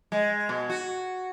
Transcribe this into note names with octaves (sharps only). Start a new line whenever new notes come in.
G#3
B2
F#4